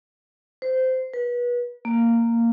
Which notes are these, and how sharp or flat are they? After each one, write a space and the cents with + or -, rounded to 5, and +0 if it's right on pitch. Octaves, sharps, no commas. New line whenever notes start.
C5 -15
B4 -30
A#3 -10